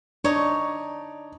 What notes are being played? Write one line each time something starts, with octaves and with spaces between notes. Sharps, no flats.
D4 D#4 C#5 D5